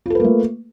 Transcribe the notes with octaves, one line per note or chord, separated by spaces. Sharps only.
A3 A#3 F4 A4 B4